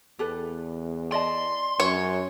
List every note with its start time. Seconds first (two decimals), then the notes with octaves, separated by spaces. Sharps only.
0.19 E2 G4 A4 B4
1.12 D5 D#5 A5 C6
1.80 F#2 C#5